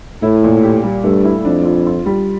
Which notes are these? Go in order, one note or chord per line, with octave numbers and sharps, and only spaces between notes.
A2 E4
A#2
G4
G3
G2 A3
E4
F2 D4
F4
F4
G3